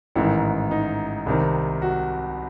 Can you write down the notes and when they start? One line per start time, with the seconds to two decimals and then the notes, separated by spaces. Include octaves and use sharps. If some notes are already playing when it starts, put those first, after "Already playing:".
0.16 A1 G#2 D#3 E4
0.71 D#4
1.26 C2 C3 D#3
1.82 F#4